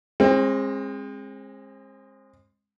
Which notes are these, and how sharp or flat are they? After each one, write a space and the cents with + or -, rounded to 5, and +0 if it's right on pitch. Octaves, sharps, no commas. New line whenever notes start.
G#3 -15 C4 +35